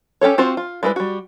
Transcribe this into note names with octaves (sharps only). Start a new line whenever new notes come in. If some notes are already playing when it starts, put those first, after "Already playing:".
C#4 G4 A4 C#5
C4 F4 F#4 C5
F4
G3 G#3 E4 A4 B4
G3 F#4